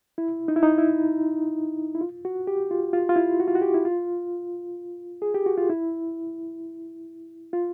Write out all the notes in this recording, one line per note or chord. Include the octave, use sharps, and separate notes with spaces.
E4
D#4
E4
D#4
E4
E4
F4
F#4
G4
F4
F4
F4
E4
F#4
F4
F#4
G4
E4
F4
G#4
G4
F#4
F4
E4
F4